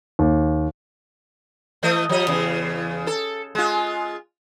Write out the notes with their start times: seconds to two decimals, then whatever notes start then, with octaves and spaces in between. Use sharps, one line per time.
0.19 D#2
1.83 E3 A3 D#5
2.09 F3 G3 D#5
2.28 E2 C#3
3.07 A4
3.55 G#3 F4